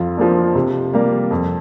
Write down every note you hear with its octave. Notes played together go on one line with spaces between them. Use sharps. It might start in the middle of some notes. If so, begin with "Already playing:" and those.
Already playing: F2 F4
F3 A#3 D4
C3
G3 A#3
F2